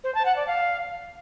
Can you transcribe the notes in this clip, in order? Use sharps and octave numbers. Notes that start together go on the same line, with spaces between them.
C5
A5
F#5
D5
F5